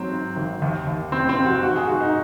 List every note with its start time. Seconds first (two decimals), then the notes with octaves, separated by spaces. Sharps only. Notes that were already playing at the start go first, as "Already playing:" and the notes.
Already playing: G#2 F#3 C4
0.12 G#2
0.37 G#1
0.62 D#2
0.87 D#2
1.12 F1 C4
1.29 C4
1.37 F1
1.46 F#4
1.63 G#2 F#4
1.75 G#4
1.88 G#2 F#4
2.01 D#4